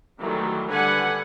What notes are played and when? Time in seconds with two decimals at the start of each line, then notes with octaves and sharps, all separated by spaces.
0.19 D#3 E3 F#3 G3 A3
0.69 D3 G3 B4 F#5 G#5